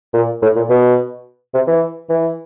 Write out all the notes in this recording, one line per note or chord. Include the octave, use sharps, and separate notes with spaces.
A#2
A2
A#2
B2
C3
E3
E3